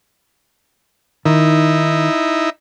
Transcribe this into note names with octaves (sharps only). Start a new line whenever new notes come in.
D#3 D#4 E4